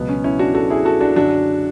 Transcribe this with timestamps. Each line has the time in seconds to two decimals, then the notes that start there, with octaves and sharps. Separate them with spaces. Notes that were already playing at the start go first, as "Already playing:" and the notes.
Already playing: C#2 B2 F#3 B3
0.09 C#4
0.24 C#4 E4
0.39 D4 F#4
0.55 F#4 A4
0.70 E4 G#4
0.85 F#4 A4
1.01 D4 F#4
1.16 F#2 D3 F#3 D4 F#4